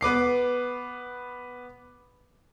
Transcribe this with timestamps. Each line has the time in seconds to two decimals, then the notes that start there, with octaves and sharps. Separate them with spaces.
0.01 B3 B4 D6 C7